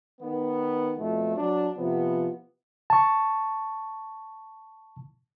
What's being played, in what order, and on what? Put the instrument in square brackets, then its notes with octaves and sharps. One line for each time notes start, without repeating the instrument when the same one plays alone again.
[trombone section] D#3 B3
F2 B2 A3
F#3 D4
C3 F3 B3
[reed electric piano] A5 C#6